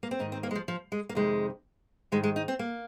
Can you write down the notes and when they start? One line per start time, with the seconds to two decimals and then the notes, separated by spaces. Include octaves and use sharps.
0.03 A#3
0.11 C4
0.19 G#2 D#3 D#4
0.32 C4
0.43 A#3
0.51 G#3
0.55 F3
0.68 F3
0.92 G#3
1.09 A#3
1.15 F2 C3 D#3 G#3
2.12 G#2 D#3 G#3
2.24 G#3
2.36 D#4
2.48 C4
2.59 A#3